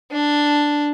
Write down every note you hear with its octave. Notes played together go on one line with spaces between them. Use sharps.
D4